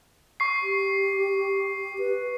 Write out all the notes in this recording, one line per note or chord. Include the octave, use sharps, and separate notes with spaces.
C#6 C7
G4
B4